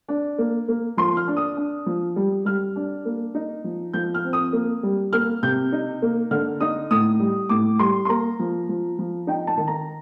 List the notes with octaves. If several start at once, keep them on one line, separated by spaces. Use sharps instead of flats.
D4
A#3
A#3
F3 C6
F6
D4
D#6
D4
F3
G3
G3 F6
D4
A#3
D#4
F3
F3 G6
F6
C4
D#6
A#3
G3
A#3 F6
C3 G6
D#4
A#3
D3 F6
D#4 D#6
A2 D#6
G3
A2 D6
G3 C6
C6
A#3 A#5
F3
F3
F3
D#4 G5
A5
D#3
A#5